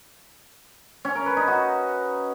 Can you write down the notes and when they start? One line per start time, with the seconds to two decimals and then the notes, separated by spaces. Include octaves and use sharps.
1.05 C#4
1.15 A#4
1.26 B4
1.37 D#4
1.48 F#4